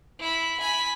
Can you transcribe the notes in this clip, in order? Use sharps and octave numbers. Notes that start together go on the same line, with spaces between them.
E4 B5
G#5 B5